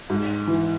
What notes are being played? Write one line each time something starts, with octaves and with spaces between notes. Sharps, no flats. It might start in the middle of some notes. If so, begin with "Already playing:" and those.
G#2
E3